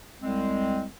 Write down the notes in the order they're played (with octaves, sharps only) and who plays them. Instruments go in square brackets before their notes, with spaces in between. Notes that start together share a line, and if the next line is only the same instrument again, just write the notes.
[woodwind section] C2 G#3 C4